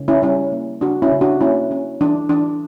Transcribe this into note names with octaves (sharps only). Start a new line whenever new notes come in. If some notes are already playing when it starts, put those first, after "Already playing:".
Already playing: C#3
C#4 E4
G3 C#4 E4
A#3
C#3 D4 F#4
C#4 E4
C#3
D4 F#4
A#3 C#4 E4
C#4
E3 D4
E3 D4